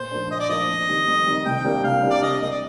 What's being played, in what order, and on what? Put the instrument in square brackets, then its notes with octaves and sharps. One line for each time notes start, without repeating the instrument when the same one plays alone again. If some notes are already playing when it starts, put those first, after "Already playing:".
Already playing: [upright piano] A#2 [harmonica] C5
[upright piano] F3 A#3 D4
[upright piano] A#2 [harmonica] D#5
[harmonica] D5
[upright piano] F3 A#3 D4 [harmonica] D#5
[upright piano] F2
D#3 G3
F2
D#3 G3
[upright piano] C2 [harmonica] G5
[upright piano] C3 G3 A#3 D4
[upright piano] C2 [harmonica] F5
[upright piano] C3 G3 A#3 D4
[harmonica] D5
[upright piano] C3 [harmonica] D#5
[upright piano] G3 A#3 [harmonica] D#5
[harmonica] D5